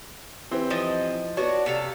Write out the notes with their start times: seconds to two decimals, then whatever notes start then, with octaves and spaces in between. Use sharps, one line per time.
0.51 E3 C4 G4
0.70 F3 D#5
1.37 B3 D4 F#4 C#5
1.66 C3 A4 F5